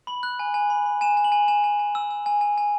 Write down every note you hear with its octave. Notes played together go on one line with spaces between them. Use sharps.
B5 F#7
F#6
G#5
G#5
B5
B5
G#5 E7
G#5
F#7
G#5
G#5 E7
G#5
G#5
E6
E6
G#5
G#5
G#5